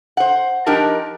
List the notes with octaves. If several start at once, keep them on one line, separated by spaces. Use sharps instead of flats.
C5 F#5
F3 D4 D#4 G4 A#4 A5